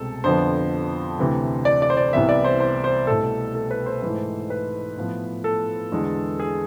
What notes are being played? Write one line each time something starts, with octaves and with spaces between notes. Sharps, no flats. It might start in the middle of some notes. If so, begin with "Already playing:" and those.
Already playing: C2 B2 G#3 C4 A4
F2 D3 F3 B3 C5
D2 C3 E3
D5
D5
C5
D5
C2 C3 E3 B3 E5
D5
C5
C5
C5
C2 B2 A3 A4
A4
B4
C5
G#2 E3 A3
B4
A2 F3 B3
A4
E2 D3 G#3
G#4